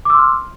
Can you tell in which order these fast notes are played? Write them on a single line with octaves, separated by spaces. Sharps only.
D6 E6 C6 F6